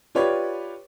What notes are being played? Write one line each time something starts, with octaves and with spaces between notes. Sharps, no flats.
F4 G4 B4 C#5 D5